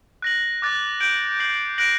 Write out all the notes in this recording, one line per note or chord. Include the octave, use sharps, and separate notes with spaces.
F#6 A#6 F#7
D6 F#6 A6
G6 D7 F#7
G6 C7 F#7
F#6 A#6 D7 F#7